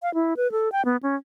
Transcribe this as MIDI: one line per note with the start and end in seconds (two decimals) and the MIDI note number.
0.02 0.13 77
0.14 0.34 64
0.37 0.51 71
0.52 0.71 69
0.72 0.84 79
0.85 0.97 59
1.03 1.16 61